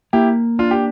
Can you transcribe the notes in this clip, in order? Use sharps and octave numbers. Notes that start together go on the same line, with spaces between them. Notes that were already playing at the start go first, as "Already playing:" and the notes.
A#3 E4 G4
D4 F4
G4